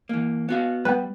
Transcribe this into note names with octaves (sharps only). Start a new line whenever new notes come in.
E3 A#3
B3 F#4 F5
G3 B3 B4